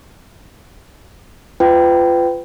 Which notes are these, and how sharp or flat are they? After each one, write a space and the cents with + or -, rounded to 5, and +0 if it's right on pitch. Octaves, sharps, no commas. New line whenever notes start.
F4 -15 B4 +30 G5 -15